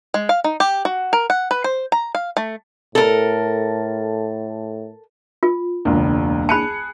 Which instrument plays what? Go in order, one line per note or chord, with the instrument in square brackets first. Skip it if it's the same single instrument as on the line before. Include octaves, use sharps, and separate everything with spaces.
[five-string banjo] G#3
F5
D#4
G4
F#4
A#4
F#5
B4
C5
A#5
F5
A3
[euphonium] A2 [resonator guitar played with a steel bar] A4 A#4
[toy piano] F4
[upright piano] E1 C#2 [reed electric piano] A#3 D4
[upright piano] G#4 F#6 C#7 [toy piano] A5 B5